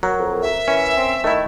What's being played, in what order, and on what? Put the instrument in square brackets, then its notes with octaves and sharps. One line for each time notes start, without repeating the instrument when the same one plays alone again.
[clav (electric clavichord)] F#3 [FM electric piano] A#4
[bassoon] F2
[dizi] E5
[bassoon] E3 [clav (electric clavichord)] C#4
[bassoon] C4
[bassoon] D#3 [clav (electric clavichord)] A3 E4